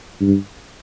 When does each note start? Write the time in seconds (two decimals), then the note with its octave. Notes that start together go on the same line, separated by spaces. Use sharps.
0.21 G2